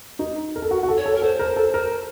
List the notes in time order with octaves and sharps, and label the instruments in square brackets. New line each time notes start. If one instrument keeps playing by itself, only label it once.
[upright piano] D#4
A#4
A4
F#4
F#4
A4
[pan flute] C#5
[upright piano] A4
[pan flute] A#4
[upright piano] A4 [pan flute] C5
[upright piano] A#4
A4
A#4